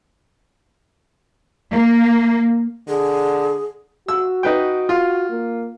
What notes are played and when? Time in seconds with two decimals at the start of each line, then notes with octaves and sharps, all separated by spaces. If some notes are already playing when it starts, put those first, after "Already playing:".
1.73 A#3
2.89 D3 G#4
4.08 F#4 E6
4.43 D#4 B4 G5
4.89 F4
5.30 A#3